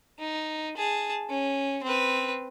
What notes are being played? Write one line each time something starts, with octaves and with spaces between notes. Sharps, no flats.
D#4
G#4 A5
C#4
C4 B4